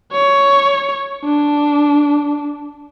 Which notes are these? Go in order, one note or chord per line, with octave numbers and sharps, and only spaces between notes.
C#5
D4